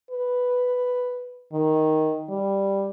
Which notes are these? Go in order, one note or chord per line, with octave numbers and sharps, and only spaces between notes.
B4
D#3
G3